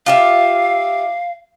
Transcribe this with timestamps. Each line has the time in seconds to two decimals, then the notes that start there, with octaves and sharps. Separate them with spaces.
0.06 F4 G4 E5 F5